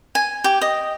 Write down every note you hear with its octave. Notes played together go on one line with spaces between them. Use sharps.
G#5
G4
D#5